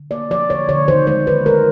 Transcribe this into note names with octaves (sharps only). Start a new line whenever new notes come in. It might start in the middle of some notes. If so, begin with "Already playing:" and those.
Already playing: D3
A#3 D5
F3 D5
D3 C#5
D3 C#5
D#3 C5
G#3 C5
D#3 B4
G#3 A#4